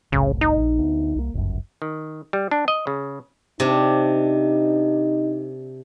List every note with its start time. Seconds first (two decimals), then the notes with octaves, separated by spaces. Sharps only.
0.12 F#1 C2 A2 C#3
0.41 D#4
0.57 A#1
0.78 D2 B3
1.16 C2 A#3
1.34 G1 C#2 F#2
1.82 D#3
2.33 G3
2.51 D4
2.68 D#5
2.87 C#3
3.60 C3 D4 D#4